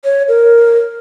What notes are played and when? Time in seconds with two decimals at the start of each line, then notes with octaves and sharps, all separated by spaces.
0.04 C#5
0.28 A#4